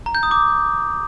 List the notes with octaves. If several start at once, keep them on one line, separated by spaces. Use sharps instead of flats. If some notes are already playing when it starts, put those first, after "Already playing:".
A#5
G6
D#6
D6